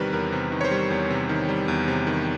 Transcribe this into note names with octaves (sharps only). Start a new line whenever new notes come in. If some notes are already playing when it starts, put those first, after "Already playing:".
Already playing: E2 C3 D#3 G3 A#4 B4 C#5
E2 A#4
C3
D#3
C#5
C5
G3
E2
C3
D#3
G3
E2
C3
D#3